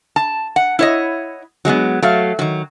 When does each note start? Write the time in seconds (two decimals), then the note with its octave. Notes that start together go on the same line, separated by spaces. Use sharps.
0.16 A5
0.56 F#5
0.79 E4 C#5 D#5
1.65 F#3 G#3 A#3 B3
2.02 F#3 A3 F5
2.39 D#3 F#3